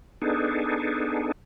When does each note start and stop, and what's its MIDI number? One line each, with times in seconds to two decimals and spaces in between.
0.22 1.32 59
0.22 1.32 62
0.22 1.32 63
0.22 1.32 68
0.22 1.32 69